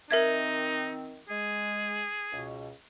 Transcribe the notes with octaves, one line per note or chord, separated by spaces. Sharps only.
D#3 C4 D#4 A#4 E5 G#6
G#3 G#4
C#2 B2